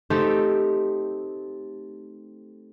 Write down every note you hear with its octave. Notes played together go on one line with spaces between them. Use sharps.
A3 C4 D#4 G4 A4